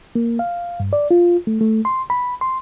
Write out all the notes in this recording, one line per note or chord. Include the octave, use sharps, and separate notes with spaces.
A#3
F5
G2
D5
F4
A3
A3
C6
B5
C6